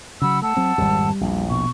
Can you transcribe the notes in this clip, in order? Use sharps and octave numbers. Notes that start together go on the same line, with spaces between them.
C#3 F#3 F#5 B5 E6
A3 F#5 A5 E6
F#3 C4
G#1 F2 G3
A#1 E2
B2 C#6